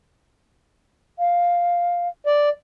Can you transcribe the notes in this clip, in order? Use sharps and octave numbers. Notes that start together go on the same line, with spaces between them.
F5
D5